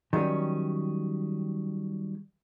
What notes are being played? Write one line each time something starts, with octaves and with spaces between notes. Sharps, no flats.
D#3 F#3 G3 C#4